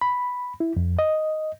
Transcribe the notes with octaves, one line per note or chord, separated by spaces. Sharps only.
B5
E4
F2
D#5